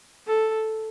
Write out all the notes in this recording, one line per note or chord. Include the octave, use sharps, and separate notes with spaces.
A4